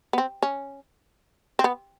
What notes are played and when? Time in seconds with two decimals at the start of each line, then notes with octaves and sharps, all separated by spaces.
0.13 B3
0.18 C4
0.42 C#4
1.59 C4
1.64 B3